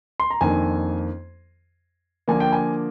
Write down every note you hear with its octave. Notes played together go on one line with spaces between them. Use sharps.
C6
A#5
F2 D#3 A#3 D4 G#5
D3 F3 A#3 D4 G#5
G5
G#5